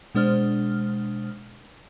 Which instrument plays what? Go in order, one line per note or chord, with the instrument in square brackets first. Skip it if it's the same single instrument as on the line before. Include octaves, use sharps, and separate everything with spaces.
[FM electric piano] B2 G#3 D4 C5 F6